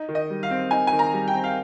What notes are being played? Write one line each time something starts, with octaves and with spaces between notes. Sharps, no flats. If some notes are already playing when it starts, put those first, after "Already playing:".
Already playing: D#4
D#3
D#5
G3
F5
C4
D#4 G#5
D#3 G#5
A#5
G3
G5
C4
F5